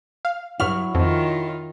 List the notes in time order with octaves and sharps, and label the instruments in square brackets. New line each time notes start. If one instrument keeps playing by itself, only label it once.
[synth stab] F5
[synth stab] G2 F6 [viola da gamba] F#3 [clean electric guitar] E4 F#4 C#5
[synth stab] F2 [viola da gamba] D#3 F4